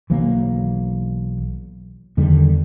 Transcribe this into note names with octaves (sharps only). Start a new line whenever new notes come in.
B1 E3 F#3 A#3
E2 D3 D#3 G3